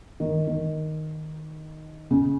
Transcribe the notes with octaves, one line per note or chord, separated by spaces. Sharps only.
D#3
D#3
C#3